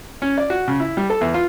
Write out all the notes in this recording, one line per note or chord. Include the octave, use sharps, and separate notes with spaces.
C#4
D5
F#4
C#3
E4
G3
A4
E2
F4